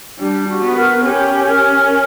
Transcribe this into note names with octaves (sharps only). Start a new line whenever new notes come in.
G3 D4
F#4
B3
A#4
C#4 G4
A#4
A#4